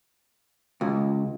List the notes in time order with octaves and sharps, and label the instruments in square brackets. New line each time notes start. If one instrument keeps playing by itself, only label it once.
[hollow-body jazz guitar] C#2